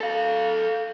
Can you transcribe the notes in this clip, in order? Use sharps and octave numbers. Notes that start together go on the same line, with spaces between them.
A4 F5